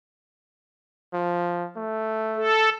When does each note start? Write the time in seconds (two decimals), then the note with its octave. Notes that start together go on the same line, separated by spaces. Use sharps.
1.13 F3
1.77 A3
2.36 A4